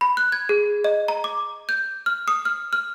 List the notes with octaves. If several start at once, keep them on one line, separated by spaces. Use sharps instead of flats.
B5
F#6
G#6
G#4
D#5
A#5
D6
G6
F6
D#6
F6
F6